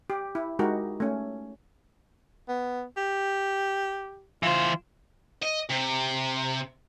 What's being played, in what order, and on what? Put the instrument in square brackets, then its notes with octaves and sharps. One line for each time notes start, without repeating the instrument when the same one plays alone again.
[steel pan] G4
E4
G#3 D#4 F#4 G4 A#4
A3 C#4
[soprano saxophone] B3
G4
[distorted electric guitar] E3 C5 [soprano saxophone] F4
[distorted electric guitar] D#5
C3